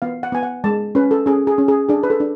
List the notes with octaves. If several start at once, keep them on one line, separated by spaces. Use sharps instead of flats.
B3 F5
F#5
B3 G#5
F#5
G#3 A5
C#4 B4
A4
C#4 G#4
G#4
C#4
G#4
D4 G#4
B4
A4
D4